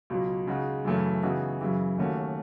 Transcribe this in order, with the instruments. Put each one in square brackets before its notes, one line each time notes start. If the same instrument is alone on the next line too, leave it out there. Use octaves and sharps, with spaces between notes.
[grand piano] C#2 B2 F#3
C#3 G#3 D#4 F#4
F#2 C#3 E3 A3 C#4
C#3 E3 B3 D#4 F#4
F#2 C#3 E3
D#2 D#3 A3 C#4 F#4